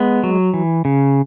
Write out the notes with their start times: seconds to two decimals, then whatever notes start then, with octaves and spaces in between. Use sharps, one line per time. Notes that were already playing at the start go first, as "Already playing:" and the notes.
Already playing: G#3 B3
0.23 F#3
0.54 E3
0.85 C#3